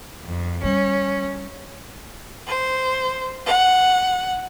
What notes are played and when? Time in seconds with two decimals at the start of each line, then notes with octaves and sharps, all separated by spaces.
0.23 F2
0.63 G3 C#4
2.47 C5
3.46 F#5